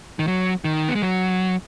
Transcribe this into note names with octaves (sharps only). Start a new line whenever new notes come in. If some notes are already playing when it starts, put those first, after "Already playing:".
D#3
F#3
D#3
B3
G#3
F#3